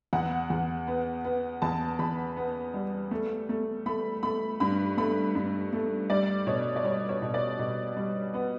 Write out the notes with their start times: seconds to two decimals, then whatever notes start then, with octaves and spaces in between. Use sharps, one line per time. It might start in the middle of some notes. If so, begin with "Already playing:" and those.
0.13 E2 F#5
0.50 E2
0.87 B3
1.25 B3
1.62 E2 A5
1.99 E2 B5
2.37 B3
2.74 G3
3.11 A3
3.49 A3
3.86 A3 B5
4.23 A3 B5
4.60 G2 B5
4.97 A3 B5
5.35 G2
5.72 A3
6.10 G3 D5
6.47 B2 C#5
6.76 D5
6.84 G3 C#5
7.09 C#5
7.22 B2
7.34 D5
7.59 B2
7.97 G3
8.34 B3